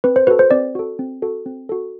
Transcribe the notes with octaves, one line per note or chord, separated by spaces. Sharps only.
C4 B4
C5
F#4 A4 B4
C5
C4 D5
F#4 A4
C4
F#4 A4
C4
F#4 A4